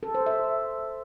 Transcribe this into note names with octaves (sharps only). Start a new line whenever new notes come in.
A4
C5
E5